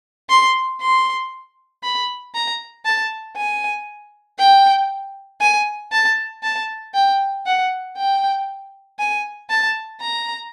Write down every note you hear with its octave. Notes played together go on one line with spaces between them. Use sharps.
C6
C6
B5
A#5
A5
G#5
G5
G#5
A5
A5
G5
F#5
G5
G#5
A5
A#5